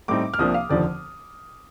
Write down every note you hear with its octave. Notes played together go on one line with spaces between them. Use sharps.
A2 G3 C4 D#4 D6
F6
C2 C3 F3 A#3 D4 D#6
F5
F1 D#2 D3 F3 D5